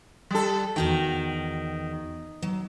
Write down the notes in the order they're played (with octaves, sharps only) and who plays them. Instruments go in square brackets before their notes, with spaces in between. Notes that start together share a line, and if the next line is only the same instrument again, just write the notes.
[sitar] G3 A4
[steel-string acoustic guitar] E2 F#4 G5 [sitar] D#3
[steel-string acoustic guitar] F#3